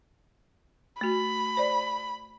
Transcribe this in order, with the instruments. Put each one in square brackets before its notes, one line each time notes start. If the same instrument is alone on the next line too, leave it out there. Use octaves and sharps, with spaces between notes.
[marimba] A3 F#4 [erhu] B5
[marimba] C5 D5